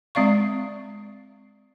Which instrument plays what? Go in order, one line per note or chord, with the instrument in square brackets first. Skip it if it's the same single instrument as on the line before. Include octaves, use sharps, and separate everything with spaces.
[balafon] G#3 C4 D5 F5 C#6